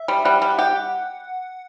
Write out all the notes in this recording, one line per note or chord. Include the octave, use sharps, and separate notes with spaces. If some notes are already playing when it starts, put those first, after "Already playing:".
Already playing: E5
G3
G3 F#5
G3
G4 F#5